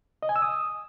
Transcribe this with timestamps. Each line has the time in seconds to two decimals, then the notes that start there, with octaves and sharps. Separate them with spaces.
0.23 D#5
0.29 G#5
0.36 E6
0.42 D#6